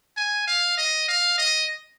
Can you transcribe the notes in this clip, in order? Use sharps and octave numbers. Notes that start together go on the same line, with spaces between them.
G#5
F5
D#5
F5
D#5